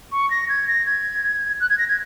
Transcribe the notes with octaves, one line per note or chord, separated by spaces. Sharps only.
C#6
A#6
G#6
A#6
G#6
F#6
G#6
A#6
G#6